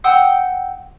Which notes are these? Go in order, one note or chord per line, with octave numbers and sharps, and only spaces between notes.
F#5 G5 D#6 E6